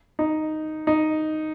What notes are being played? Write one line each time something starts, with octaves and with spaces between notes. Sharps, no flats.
D#4
D#4